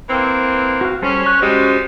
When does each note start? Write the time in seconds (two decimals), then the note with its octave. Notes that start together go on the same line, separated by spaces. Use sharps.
0.09 E3 A#3 C4
0.81 F#4 F5
1.02 G3 C#4 A4 C5
1.26 C#6 F#6
1.41 G3 G#3 C#4 F#4 C5